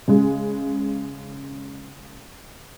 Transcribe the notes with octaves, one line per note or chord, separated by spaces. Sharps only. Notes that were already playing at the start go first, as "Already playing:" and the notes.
C#3 G#3